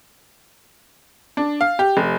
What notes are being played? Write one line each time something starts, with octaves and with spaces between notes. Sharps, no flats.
D4
F5
G4
F1